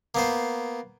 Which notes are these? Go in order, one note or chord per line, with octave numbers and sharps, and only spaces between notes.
A#3 B3 C5